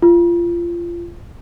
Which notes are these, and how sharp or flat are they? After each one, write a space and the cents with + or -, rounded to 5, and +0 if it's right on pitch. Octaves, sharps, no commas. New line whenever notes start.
F4 -25